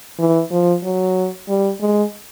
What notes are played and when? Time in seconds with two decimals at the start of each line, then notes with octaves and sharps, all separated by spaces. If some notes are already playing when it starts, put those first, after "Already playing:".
0.19 E3
0.51 F3
0.83 F#3
1.48 G3
1.81 G#3